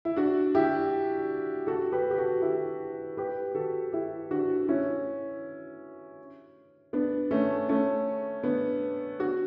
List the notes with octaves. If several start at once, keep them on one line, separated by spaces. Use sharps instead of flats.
E4
D4 F#4
E4 G4
F#4 A4
G4 B4
G4
F#4 A4
E4 G4
G4 B4
F#4 A4
E4 G4
D4 F#4
C#4 E4
B3 D4
A3 C#4
A3 C#4
B3 D4
D4 F#4